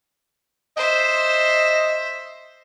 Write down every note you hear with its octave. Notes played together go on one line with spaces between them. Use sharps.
C5 D#5 E5